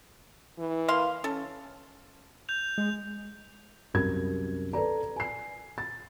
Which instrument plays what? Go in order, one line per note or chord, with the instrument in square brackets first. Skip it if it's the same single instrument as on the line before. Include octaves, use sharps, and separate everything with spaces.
[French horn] E3
[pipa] A#3 F5 C6
[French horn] C#4 [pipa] A4
[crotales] G6 F7
[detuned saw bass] G#3
[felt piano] C2 F#2 A#4 G#6
A4 B4 D5 A#5
G#5 C7
A6